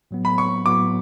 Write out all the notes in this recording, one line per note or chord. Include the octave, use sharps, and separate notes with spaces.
A2 F#3 B3
B5
C#6
A2 F#3 B3 D6